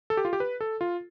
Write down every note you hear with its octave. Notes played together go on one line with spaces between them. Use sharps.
A4
G4
F4
G4
B4
A4
F4